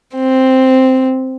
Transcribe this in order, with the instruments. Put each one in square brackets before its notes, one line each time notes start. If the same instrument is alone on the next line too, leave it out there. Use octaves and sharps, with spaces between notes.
[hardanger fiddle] C4